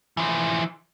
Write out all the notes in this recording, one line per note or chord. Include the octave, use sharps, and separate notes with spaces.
E3 F3